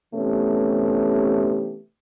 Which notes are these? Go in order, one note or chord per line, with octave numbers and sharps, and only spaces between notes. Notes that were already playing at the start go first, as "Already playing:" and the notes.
C3 E3 A3 B3 C#4 G4